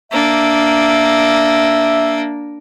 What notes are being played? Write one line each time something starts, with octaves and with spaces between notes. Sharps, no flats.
A#3 D4 E5